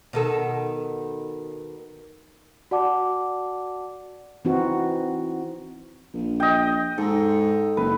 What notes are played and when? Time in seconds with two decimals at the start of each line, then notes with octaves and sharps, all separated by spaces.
0.13 B2 D#3 A4
2.71 F#4 D5 F#5 A5 D6
4.45 E3 C4 D#4 F#4
6.14 A#1
6.40 D#5 G5
6.98 G#2 A4
7.77 F#1 B4